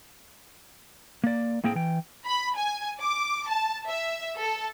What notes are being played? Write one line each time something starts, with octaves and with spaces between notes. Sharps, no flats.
A#3 D5
A2 A#3 C4 G#4 G5
E3 G5
B5
G#5
D6
A5
E5
A4